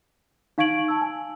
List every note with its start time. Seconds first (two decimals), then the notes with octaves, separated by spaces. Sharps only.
0.58 D#4 F5 C#6 G#6 D7 F#7
0.88 A5 E6
1.01 G#5